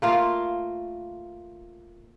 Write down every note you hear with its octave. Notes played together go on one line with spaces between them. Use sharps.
A3 A#3 F4